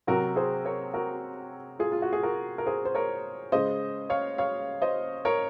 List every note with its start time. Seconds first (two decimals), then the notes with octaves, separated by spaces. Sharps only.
0.07 C3 F#3 F#4 A#4
0.36 G#4 C5
0.65 A#4 C#5
0.94 F#4 A#4
1.79 F4 G#4
1.92 F4
2.02 F#4
2.13 G#4
2.23 F#4 A#4
2.58 A#4
2.66 G#4 C5
2.85 C5
2.95 A#4 C#5
3.52 C#3 G#3 C5 D#5
4.10 C#5 F5
4.38 C#5 F5
4.82 C5 D#5
5.25 A#4 C#5